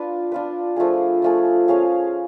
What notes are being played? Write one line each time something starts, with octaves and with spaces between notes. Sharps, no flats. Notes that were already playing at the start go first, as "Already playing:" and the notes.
Already playing: D4 F4 B4
D4 F4 B4
F3 A3 F4 G#4
F3 A3 F4 G#4
C#4 G#4 C#5 F5